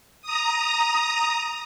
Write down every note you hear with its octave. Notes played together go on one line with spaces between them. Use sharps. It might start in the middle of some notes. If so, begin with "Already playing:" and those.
A#5 D#6